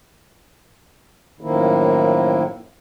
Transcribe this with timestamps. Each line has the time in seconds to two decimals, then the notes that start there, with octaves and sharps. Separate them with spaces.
1.41 F#2 A2 D#3 F3 A#3 E4